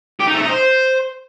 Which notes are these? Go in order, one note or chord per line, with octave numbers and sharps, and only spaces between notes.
G4
D#4
A3
D#4
C5